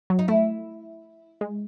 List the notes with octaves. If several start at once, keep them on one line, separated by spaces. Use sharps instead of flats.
F#3
D#4
A3 E4
G#3